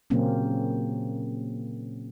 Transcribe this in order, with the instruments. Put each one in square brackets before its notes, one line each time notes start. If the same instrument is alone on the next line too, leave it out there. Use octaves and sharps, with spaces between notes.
[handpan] A#2 C#3 F#3 A#3 C4 C#4